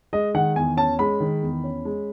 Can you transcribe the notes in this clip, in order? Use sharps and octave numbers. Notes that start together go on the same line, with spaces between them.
G#3 D#5
D#3 F#5
E2 G#5
C#4 A5
G#3 B5
D#3
E2
C#4
G#3